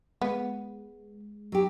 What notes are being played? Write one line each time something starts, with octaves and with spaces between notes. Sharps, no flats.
G#3 B3
F#3 G4